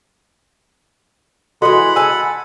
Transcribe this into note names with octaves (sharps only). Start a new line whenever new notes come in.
E3 G#3 F#4 A4 F#5 B5 C6
G#5 A5 E6